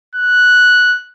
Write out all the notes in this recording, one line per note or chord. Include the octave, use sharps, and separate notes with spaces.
F#6